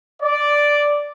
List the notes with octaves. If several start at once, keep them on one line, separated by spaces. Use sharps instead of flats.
D5